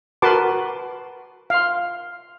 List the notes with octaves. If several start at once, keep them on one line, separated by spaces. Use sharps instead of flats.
F#4 A#4 B4 A5 C6 D6
F5 C6